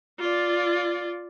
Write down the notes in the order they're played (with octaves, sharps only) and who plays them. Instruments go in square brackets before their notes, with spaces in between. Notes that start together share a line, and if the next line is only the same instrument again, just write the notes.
[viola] F4 D5